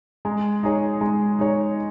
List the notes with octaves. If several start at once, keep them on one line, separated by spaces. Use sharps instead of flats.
G#3
D#4 G#4 C#5
G#3
D#4 G#4 C#5